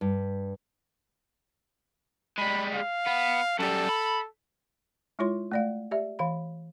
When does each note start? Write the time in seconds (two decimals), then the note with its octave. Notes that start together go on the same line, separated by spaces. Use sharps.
0.01 G2
2.38 G3 G#3 B5
2.74 F5
3.07 B3
3.59 F#2 G3 A4
3.89 B5
5.19 G#3 E4 F4 C#5 C6
5.52 A3 D5 F5
5.91 G4 D5 E5
6.19 E3 F5 B5